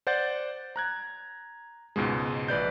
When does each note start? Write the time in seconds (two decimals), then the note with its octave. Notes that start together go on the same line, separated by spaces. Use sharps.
0.07 C5 D5 F#5 G6 A6
0.76 A#5 F#6 G#6
1.96 C#2 G#2 B2 G#3
2.48 A#1 B4 D5 G6